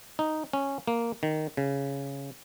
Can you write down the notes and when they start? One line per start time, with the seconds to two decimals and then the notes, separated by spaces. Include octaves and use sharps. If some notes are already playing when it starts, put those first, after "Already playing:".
0.19 D#4
0.53 C#4
0.88 A#3
1.23 D#3
1.57 C#3